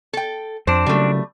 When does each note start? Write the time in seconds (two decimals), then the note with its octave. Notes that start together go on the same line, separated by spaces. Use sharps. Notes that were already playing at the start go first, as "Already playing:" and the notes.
0.13 A4 G5
0.67 F2 C4 D4 C5
0.86 C#3 F#3 G3 A3